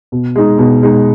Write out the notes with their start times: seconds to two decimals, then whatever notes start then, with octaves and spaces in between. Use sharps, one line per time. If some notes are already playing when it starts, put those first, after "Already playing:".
0.12 B2
0.36 G#3 D#4
0.58 B2
0.83 G#3 D#4